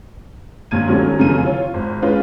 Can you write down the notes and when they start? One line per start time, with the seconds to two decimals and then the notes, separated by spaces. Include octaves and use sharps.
0.71 G1 D#2 A#2 G#6 D#7
0.88 D#3 F#3 G3 A3 C4 C#4
1.18 F1 F#2 C#3 E3 A3 D#7
1.43 F4 C#5
1.74 G#1
2.02 G#3 C#4 F4 B4